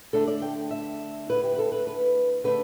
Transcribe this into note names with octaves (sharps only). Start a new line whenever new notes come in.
D3 A3 D4 A4
D5
G5
E5
D3 A3 E4 B4
G4
B4
A4
B4
B4
D3 A3 D4 B4